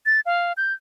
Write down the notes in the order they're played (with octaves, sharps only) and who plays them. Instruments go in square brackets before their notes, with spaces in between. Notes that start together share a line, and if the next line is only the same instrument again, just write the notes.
[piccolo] A6
F5
G6